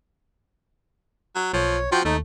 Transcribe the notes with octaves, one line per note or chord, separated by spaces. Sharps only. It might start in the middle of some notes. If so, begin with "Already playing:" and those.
F#3
B1 F3 C#5
F3 F#4 G5 G6
D#2 A3 D#4